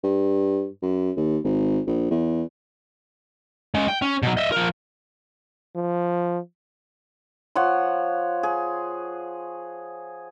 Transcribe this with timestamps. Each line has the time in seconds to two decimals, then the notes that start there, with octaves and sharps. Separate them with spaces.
0.04 G2
0.82 F#2
1.17 D#2
1.44 G#1
1.87 A#1
2.10 E2
3.75 G#3 C#4
3.88 G5
4.02 C#4
4.23 B2 F#3
4.37 D#5 E5
4.52 F3 A#4
5.75 F3
7.55 F3 C#5 F#5 C6
8.43 G#4